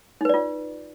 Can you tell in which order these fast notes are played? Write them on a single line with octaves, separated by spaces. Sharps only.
D#4 B4 D5 F4